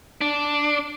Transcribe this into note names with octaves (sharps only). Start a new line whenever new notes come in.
D4